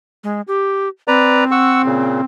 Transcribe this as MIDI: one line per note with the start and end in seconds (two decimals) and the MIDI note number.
0.24 0.41 56
0.48 0.89 67
1.08 2.25 60
1.08 1.44 71
1.08 1.44 74
1.08 1.44 82
1.51 1.82 78
1.51 1.82 85
1.51 1.82 88
1.85 2.21 46
1.85 2.21 49